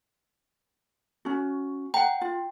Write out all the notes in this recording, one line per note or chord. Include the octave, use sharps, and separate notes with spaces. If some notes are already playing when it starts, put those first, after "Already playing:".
C#4 F#4
F#5 G5 A#5
F4